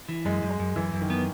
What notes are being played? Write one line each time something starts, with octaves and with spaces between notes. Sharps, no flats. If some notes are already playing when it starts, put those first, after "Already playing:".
E3
F#2 G#3
F#2
G#3
F#2
F#2 E3
F#2
D#3
B3